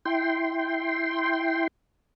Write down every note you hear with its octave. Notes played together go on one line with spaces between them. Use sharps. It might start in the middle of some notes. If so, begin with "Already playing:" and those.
E4 G5 C6